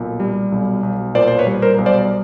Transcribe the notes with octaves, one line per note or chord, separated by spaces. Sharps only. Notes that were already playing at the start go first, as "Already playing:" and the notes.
Already playing: B1 A#2
G3
B1
B1
A#2 C5 D5
C5
B4 C#5
G3
A#4 C5
B1
C5 D5